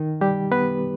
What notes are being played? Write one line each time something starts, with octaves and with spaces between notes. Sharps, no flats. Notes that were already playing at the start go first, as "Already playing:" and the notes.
Already playing: D#3 D#4
G3 G4
B3 B4